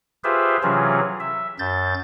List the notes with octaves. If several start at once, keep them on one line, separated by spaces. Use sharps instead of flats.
F4 G4 G#4 B4 C5 E5
C3 E3 F#3 C#4 F4 G#4
E5
F#2 G6 A6